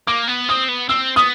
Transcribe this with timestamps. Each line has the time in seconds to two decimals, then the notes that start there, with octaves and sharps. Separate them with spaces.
0.07 A#3 D6
0.28 B3
0.49 C4 D#6
0.69 B3
0.89 C4 E6
1.16 B3 D#6